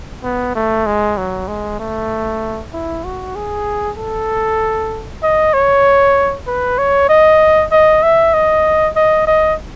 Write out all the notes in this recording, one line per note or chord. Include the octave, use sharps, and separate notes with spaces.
B3
A3
G#3
F#3
G#3
A3
E4
F#4
G#4
A4
D#5
C#5
B4
C#5
D#5
D#5
E5
D#5
D#5
D#5